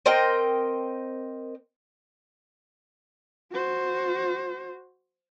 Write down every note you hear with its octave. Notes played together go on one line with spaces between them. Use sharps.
C4 A#4 D#5 G5
F#4 C5